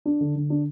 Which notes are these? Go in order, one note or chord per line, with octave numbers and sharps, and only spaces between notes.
D4
D3
D3
D4